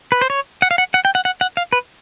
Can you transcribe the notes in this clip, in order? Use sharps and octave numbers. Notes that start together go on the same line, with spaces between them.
B4
C5
C#5
F#5
F5
F#5
F#5
G5
F#5
F#5
F#5
F5
B4